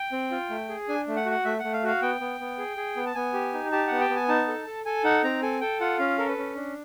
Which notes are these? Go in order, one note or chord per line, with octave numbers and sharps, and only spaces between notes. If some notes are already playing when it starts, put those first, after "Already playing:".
Already playing: G5
C4
F4
A3
G#4
D4 G#5
A3
F#5
F#4
F#5
A3 E5
A3 F#5
F5
F#4 F5
B3 G5
B3
B3
G#4
G#4
B3
A5
B3 G#5
G4
D#4
G4 A5
B3 F#5
G5
B3
G#5
D#4 A5
A4
A4
A4 G#5
D#4 F#5
C4 A#5
A4 G#5
A4 G5
F4 F#5
C#4 F5
A4 A#4
B4
C#4
D4